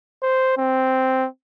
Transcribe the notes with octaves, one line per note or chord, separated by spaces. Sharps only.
C5
C4